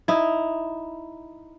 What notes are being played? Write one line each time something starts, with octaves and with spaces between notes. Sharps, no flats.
D#4 E4